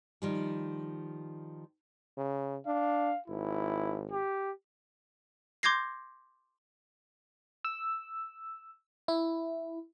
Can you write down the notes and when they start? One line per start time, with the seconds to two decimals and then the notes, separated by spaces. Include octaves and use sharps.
0.22 D#3 F3 G3
2.17 C#3
2.67 D4 F5
3.28 G#1 E4
4.12 G4
5.63 C6 D6 G6 G#6 A#6 C7
7.65 E6
9.08 E4